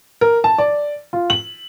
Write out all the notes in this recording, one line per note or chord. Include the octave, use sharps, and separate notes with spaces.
A#4
A5
D5
F4
F#7